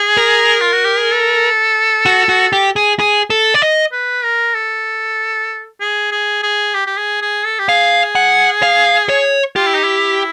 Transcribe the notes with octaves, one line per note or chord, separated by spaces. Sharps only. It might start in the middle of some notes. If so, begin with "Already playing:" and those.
Already playing: G#4
A#4
F4
F#4
G4
G#4
A4
F#4
F#4
G4
G#4
G#4
A4
D5
D#5
B4
A#4
A4
G#4
G#4
G#4
G4
G4
G#4
G#4
A4
G4
G#4 F5
F#5
F5
C#5
F4 G4
E4
D#4
E4